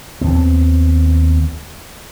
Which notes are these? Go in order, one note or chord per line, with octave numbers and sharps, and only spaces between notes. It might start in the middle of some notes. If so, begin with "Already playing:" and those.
D#2 B3 C4